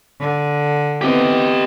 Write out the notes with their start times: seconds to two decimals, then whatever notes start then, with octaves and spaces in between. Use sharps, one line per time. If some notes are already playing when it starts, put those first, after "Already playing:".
0.21 D3
1.01 B3 C4 E4 G4 D#5